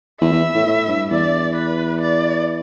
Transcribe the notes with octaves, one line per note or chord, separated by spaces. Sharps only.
E2 E5
E2
A2
A2
G2
E2 D5
B4
D5